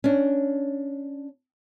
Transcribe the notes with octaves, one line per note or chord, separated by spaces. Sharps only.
C#4 D4